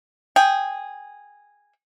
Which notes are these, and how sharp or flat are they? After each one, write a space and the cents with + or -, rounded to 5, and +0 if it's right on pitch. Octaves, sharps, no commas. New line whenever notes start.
G#4 -10 G5 +0